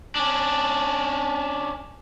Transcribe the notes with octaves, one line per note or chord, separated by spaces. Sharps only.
C#4 D4